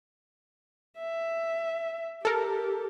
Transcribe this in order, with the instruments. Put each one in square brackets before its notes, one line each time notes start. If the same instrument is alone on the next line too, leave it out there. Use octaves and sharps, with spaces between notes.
[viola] E5
[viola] G4 [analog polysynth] A4 A#4